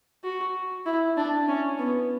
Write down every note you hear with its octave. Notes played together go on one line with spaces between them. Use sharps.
F#4
E4
D4
C#4
B3